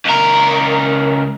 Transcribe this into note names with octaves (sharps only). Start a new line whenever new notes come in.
C#2 A#4